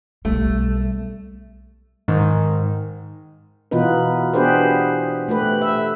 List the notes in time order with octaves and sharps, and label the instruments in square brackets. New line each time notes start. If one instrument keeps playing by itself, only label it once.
[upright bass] B1 G3 [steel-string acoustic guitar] A3
[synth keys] G#2 D#3
[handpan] B2 E3 B3 D#4 F4 B4
B3 D4 G4 G#4 B4 C5
A3 G4 B4
E5